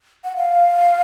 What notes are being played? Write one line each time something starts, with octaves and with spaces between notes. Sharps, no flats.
F#5
F5